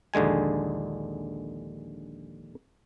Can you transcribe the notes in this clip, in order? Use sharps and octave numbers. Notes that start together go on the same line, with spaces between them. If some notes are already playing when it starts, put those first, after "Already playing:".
A#1 D#2 D3 G#3 G#5